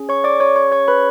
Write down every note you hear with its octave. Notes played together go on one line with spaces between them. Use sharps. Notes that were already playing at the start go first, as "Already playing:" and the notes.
Already playing: C#4 G#4
C#5 C#6
D5 D6
C#5 C#6
C#5 C#6
C#5 C#6
B4 B5